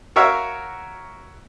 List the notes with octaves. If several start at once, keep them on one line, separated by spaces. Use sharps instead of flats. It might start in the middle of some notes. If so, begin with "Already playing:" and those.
F#4 A#4 C#5 E5 F5